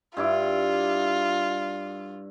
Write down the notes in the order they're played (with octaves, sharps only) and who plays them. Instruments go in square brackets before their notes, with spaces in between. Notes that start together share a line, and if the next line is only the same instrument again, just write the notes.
[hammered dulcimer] G2 E4 D6 [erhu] F4